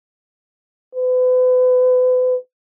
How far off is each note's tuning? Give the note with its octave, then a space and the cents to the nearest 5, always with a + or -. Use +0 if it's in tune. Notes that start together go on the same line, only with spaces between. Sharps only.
B4 +40